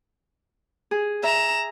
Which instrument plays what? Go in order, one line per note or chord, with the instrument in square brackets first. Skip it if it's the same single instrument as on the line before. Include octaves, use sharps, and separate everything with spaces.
[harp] G#4
[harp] E5 [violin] A#5 E7